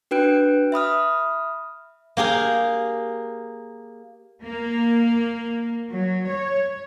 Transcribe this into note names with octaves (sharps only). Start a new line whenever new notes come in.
D4 F#4 B4 G5 F#6 D7
E5 B5 D#6 F6
A#3 G4 G#4 A#4
A#3
F#3
C#5